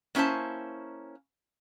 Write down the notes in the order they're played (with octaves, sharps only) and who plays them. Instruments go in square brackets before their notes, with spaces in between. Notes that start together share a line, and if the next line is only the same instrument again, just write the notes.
[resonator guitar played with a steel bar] A#3 C#4 E4 C5 A5